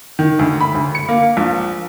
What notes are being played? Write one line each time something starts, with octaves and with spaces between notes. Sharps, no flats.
D#3
D2
B5
D2
C#7
A#3
A#1